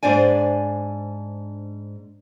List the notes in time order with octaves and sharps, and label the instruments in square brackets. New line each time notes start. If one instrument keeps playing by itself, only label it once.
[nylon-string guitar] G#2 D4 C5 D5 G#5